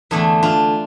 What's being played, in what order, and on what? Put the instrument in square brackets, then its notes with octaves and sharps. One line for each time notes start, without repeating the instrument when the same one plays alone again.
[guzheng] E2 D3 A3 D4
D4 F4